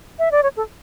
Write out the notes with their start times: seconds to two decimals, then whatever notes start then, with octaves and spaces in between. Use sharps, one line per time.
0.19 E5
0.31 D5
0.43 C#5
0.57 A4